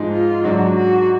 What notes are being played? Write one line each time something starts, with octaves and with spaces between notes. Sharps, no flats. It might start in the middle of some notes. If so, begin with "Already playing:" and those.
Already playing: G#2 F3 G#3 D#4
F4
G#2 F#3 D4 F#4
F#4